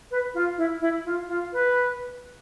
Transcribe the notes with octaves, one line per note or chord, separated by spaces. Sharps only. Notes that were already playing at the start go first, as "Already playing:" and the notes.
B4
F4
E4
E4
F4
F4
B4